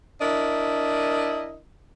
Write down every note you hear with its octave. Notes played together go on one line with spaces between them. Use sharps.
D4 E4 A#4 D#5